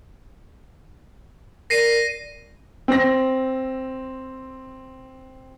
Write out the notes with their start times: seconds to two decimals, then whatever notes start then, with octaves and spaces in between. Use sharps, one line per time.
1.70 A#4 D5 A#6 C7 D#7
2.88 C4 A#6